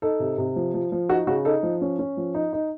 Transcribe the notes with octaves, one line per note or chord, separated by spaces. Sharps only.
D#4 A4
C3
C3
F3
F3
F3
D#4 F#4
C#3 F#4
D#4 A4
F3
C#4
C#4
F3
D#4
D#4